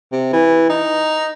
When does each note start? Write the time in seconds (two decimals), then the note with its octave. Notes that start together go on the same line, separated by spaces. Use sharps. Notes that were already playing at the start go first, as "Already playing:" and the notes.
0.13 C3
0.33 E3
0.70 D#4